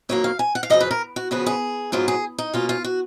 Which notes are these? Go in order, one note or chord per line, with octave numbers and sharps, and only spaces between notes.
F2 D#3 F#3 A#3 C#5
F5
G#5
F#5
F5
F#2 C#3 F3 D#5
B4
A#4
F#4
C#3 F3 B3 F#4
G#4
G#2 F#3 B3 F4
G#4
D#4
B2 A#3 C#4 F4
F4
F#4